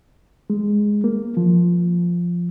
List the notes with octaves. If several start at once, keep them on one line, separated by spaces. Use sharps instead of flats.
G#3
A#3
F3